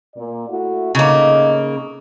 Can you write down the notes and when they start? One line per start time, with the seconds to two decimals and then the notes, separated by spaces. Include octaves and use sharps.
0.15 A#2 A#3 D5
0.48 A3 E4 F#4
0.95 A2 C#3 A#3 D#4 D#5